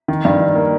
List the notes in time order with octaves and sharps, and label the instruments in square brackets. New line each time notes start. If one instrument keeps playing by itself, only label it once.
[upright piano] D#3
G2
D#3
A#3